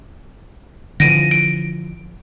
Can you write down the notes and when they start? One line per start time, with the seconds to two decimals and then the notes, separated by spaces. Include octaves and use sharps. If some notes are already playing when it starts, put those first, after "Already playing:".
1.00 D3 E3 F3 A#6 D7 D#7
1.31 D7